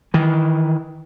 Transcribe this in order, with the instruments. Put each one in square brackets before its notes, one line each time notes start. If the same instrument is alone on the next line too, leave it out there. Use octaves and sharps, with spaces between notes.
[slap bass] D#3 E3